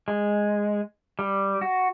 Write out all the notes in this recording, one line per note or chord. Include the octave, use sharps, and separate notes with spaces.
G#3
G3
F#4